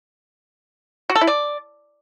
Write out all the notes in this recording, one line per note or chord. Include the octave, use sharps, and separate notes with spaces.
F#4
A4
E4
D5